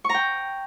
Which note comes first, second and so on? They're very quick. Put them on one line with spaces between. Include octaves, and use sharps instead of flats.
C#6 A#5 G5